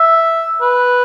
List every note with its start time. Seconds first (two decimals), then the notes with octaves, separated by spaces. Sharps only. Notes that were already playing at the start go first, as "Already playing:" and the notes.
Already playing: E5
0.61 B4